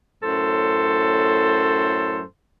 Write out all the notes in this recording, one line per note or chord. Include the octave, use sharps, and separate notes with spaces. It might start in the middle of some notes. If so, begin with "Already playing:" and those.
F#2 A2 A4 C5